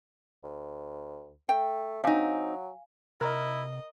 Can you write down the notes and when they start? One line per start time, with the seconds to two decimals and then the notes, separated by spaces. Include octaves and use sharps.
0.44 D2
1.49 A3 G5
2.04 F#3 C4 D#4 F5 G#5
3.21 C3 E4 A#4 D#5